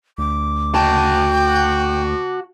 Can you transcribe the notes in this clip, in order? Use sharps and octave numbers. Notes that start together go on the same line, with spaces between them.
D2 D6
F#4 G5 A5